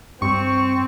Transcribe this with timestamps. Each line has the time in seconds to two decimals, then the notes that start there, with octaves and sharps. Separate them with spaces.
0.22 G2 C4 C#6